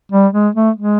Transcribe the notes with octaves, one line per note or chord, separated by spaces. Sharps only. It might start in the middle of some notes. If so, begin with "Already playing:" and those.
G3
G#3
A3
G#3